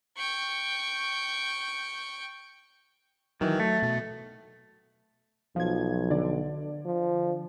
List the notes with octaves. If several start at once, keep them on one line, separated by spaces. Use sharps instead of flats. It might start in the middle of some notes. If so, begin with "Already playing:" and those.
G5 C#6
D#3 E3 F#3
A3
B2
B1 F3 G#6
D3 D5
F3